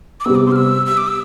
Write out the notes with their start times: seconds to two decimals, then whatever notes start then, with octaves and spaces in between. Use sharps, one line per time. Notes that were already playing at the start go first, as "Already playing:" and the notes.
0.20 D6
0.25 C3 G3 B3 E6
0.35 D6
0.46 C6
0.51 F6
0.56 E6
0.86 E6
0.97 D6
1.08 E6